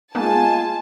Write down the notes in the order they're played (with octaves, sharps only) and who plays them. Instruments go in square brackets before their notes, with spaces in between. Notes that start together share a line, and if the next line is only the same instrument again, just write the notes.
[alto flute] G#3 [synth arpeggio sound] A#3 B3 D#4 [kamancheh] F4 G#5 [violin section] A5